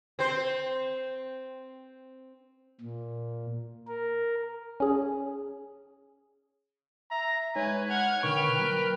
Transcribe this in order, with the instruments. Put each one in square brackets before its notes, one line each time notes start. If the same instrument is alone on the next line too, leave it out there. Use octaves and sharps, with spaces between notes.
[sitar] C4 C5
[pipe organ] A#2
A#4
[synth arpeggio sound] C#4 G#4
[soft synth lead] E5 [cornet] A#5
[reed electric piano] G#3 D#4 [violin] B4 [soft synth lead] C#5 [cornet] G#5
[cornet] F#5 [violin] F6 G#6
[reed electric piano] B2 D3 C#6 [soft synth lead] D#3 [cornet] B4 [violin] G5 F6
[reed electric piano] F#3 A#3 [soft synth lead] A#4